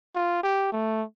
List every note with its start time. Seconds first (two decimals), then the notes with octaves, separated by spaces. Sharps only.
0.15 F4
0.43 G4
0.72 A3